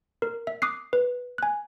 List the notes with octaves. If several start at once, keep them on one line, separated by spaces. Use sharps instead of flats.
A#4
E5
D6 D#6 F#6 C7
B4
G#5 F#6